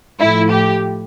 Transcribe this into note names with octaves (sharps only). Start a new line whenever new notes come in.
A2 F3 E4
G4